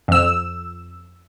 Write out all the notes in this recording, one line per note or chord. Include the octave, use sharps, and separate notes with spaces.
F2 E6